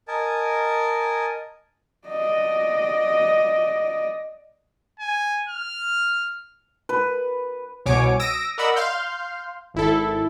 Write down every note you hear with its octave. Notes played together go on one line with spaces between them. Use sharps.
A#4 D#5 G#5 A5
D5 D#5
G#5
F6
B4
C2 B2 C#5 G#5 D6
D#6 E6 A#6 D7
A#4 D5 D#5 F#5 B5 E6
F5 C6 F6 G6
G#1 E4 A4